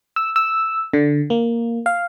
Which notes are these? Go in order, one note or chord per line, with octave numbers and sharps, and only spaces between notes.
E6
E6
D3
A#3
F5